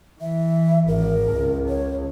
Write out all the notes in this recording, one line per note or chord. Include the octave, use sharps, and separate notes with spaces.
E3 E5
G#1 A#4
C#2
C#5